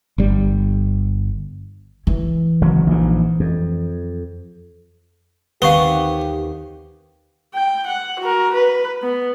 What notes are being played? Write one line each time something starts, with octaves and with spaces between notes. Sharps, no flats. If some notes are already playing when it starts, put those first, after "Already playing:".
G1 G3
E3
G#1 C#3 F#3
A#1 G#2
F2
D#2 D#3 B3 C4 G4 F5 C#6 G7
G5
F#5
F#4 A#4
B4
B3